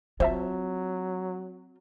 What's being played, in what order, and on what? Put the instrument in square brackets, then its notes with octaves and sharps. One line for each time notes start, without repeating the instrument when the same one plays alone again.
[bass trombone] F#3 [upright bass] C4 F4 [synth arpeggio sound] C5 E5 A5